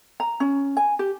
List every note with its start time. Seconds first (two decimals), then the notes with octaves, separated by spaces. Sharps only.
0.20 A#5
0.40 C#4
0.77 G#5
0.99 G4